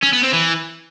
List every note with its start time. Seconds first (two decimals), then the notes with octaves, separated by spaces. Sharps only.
0.03 C#4
0.13 B3
0.23 C4
0.33 E3